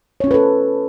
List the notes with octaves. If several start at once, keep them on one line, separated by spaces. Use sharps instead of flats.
C#4 F4 A4 B4 C#5